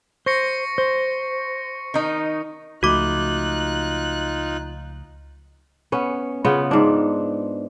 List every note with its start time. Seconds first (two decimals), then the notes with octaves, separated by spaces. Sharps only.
0.26 C5 C#6 A#6 C#7
0.78 C5
1.94 D#3 D#4
2.83 C#2 F3 A3 D#4 F4 F#4 D6 F#6
5.92 B3 C#4
6.44 C#3 B3 F4
6.71 G#2 D4